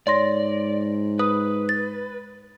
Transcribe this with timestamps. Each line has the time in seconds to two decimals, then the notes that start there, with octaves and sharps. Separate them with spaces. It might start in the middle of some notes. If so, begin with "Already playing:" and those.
0.07 G#2 C#5 D5 C6 A#6
1.19 B4 D#6
1.69 A6